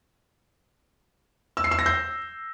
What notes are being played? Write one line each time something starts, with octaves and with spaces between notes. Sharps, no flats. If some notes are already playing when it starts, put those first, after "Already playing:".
E6
C7
E6
A#6
G6